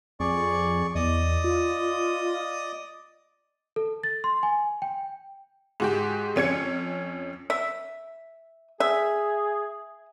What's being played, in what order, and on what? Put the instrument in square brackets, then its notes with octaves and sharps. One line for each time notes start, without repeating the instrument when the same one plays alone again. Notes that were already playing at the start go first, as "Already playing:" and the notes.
[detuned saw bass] F2 [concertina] G#4 D5 C#6
[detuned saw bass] E2 [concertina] D5 D#5 D#6
[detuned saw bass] F4
[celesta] A4
A6
C6
G#5
G5
[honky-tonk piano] G#2 F#4 G4
F2 C#4 G#6 C#7
[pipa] E5
[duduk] G#4 [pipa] E5